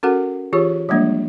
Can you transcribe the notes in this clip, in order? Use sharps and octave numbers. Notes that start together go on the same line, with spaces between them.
C#4 F#4 A4 A#4 F#5
E3 F4 G4 G#4 C#5
F3 G3 G#3 A#3 D4